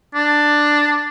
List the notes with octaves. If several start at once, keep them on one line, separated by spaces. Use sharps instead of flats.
D4